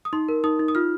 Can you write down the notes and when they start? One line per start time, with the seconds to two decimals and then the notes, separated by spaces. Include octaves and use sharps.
0.05 D#6
0.13 D#4 C6
0.29 A#4
0.44 D#4 D#6
0.60 D#4
0.68 D#6
0.75 F4 F6